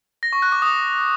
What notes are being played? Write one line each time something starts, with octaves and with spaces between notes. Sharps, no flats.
A#6
C#6
F#6
D6
D#6